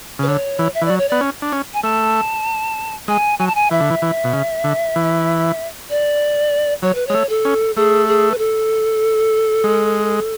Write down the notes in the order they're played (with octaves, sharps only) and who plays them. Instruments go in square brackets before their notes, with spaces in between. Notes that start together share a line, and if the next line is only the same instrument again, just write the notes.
[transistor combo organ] C#3
[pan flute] B4
[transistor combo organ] D3 [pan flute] C#5
[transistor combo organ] E3
[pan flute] E5
[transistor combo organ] E3
[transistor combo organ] F#3 [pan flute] D5
[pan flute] C#5
[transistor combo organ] B3 [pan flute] D5
[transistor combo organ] C#4
D4
C#4
[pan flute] G#5
[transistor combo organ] A3 [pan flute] A5
[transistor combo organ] G#3 [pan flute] G#5
[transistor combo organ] F#3 [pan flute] G#5
[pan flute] A5
G#5
[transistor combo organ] E3 [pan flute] E5
[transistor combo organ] D3
E3
E3
B2
C#3
D3
E3
[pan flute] D5
[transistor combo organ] F#3 [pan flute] C#5
[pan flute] B4
[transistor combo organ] G#3 [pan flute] C#5
[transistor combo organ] A3
[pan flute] A4
[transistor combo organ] C#4
[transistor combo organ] A3 [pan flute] G#4
[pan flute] G#4
B4
A4
[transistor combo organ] G#3